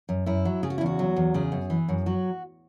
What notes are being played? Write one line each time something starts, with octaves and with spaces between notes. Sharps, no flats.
F#2
F#2 E4
F#3
C#3 G#4
F#4
E4
E2 F#4
F#3
E2
C#3 G#4
F#2
E3
F#2
F#3 F#4